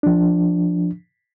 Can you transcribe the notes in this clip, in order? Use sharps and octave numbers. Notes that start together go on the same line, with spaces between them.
F3 D4